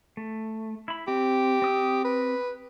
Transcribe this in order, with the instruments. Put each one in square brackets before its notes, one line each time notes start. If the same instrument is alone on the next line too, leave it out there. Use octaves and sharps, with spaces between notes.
[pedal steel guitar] A3
E4 B5
[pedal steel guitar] C4 [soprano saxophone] G4
[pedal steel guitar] C4 D#6 E6
[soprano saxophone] B4